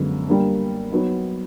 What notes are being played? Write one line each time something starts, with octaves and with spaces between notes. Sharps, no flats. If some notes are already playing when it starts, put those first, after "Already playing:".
Already playing: F#2 D3 F3 G#3 B3
G3 A#3 D4
F#3 B3 D#4